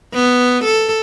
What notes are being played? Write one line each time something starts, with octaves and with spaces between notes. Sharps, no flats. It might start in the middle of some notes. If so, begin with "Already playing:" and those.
B3
A4